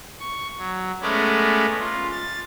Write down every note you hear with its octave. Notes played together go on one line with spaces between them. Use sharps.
C#6
F#3
G#3 A3 B3 C#4 A#4 D5
F4
A6